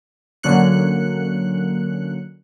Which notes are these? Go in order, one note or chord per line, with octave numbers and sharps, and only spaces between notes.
D3 F#3 A#3 C#4 F#6 C#7